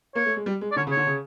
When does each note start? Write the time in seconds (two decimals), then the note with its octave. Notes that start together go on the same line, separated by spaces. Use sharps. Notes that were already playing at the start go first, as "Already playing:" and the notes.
0.15 A#3 C#5
0.26 A3
0.36 G#3
0.46 G3
0.61 G#3
0.72 D5
0.76 D3 C#5
0.87 C#3
0.91 C#5
0.97 D3
1.07 C#3